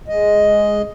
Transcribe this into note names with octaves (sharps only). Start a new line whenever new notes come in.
G#3 D#5